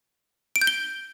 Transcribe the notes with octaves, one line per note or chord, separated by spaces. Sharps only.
D7
G6
G7